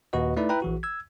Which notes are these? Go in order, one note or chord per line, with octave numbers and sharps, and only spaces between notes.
D#2 A#2 F#4 B4 D#5
A3 D#4 E4 B4 D5
E4 B4 G5 A#5
A#1 E3 F#4
E6 G#6